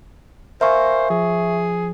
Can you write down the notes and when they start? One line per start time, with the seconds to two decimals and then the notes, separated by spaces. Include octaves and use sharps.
0.61 A#4 C5 E5 F5 G#5 C#6
1.10 F3 G#4